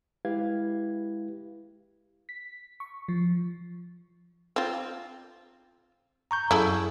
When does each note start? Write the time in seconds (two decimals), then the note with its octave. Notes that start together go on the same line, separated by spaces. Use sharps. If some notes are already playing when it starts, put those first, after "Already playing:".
0.25 G#3 E4 G4 B4 F5 G#6
2.29 B6
2.80 C#6
3.08 F3
4.56 C4 F4
6.31 A#5 C#6 G6
6.51 F#2 E4 G#4 A4